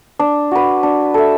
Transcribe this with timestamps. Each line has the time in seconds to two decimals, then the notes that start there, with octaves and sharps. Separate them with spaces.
0.19 D4
0.51 F#4 B4
0.83 D4
1.14 A4 E5